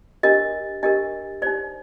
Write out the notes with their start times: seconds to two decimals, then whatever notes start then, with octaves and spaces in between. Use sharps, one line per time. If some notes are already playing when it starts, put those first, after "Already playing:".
0.23 D4 G4 A#4 D#5
0.83 D4 G4 A#4 D#5
1.42 D#4 G4 C5 D5